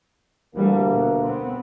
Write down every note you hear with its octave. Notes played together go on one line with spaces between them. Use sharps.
D2 D3 E3 G3 A3 A#3
B2
B3 C4